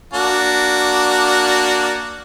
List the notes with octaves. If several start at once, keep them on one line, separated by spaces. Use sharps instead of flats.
A#3 D4 F#4